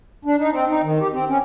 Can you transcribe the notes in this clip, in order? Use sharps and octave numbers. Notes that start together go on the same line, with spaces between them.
D4
D#4
C4
D#4
D#3
G4
C4
C#4